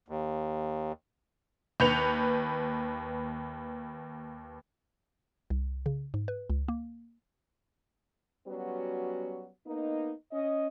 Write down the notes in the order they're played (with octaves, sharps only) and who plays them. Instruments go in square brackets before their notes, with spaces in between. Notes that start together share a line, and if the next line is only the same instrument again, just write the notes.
[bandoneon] D#2
[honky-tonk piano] D#2 B4 G6 C#7 F7
[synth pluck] C2
C#3
G#2
B4
C#2
A#3
[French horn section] F#3 G3 B3 C#4 F#4
A#3 B3 D#4
C#4 D#5